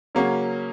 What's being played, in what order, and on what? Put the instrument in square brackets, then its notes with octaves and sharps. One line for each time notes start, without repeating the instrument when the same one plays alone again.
[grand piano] C#3 F#3 A#3 C#4 F#4